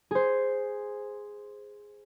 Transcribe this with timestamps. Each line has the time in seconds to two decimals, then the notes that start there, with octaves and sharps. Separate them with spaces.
0.11 G#4 C5